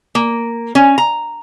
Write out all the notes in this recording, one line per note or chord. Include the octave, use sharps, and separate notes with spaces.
A#3
C#4
A#5